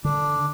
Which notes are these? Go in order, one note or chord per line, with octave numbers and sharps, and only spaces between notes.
D3 D4